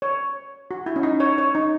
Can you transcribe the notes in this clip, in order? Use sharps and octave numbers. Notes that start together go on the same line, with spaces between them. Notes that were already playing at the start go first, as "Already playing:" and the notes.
C#5
F#4
E4
C#4
D#4
C#5
C#5
D#4